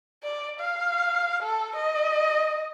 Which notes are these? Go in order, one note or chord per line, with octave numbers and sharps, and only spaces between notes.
D5
F5
A4
D#5